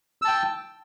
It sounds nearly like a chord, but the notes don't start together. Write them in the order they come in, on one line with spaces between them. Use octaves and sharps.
E6 A5 G5